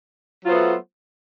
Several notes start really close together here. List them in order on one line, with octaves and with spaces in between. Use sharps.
F#3 F4 C5 B3 A3